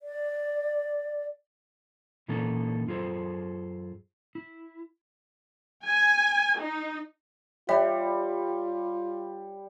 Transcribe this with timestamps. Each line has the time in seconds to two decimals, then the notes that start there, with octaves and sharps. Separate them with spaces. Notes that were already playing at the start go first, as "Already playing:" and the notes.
0.01 D5
2.28 A#2 E3 A#3 C#4 D#4 A4
2.87 F#2 F4 G#4 A4 C5
4.35 E4
5.84 G#5
6.58 D#4
7.69 G3 F4 C#5 E5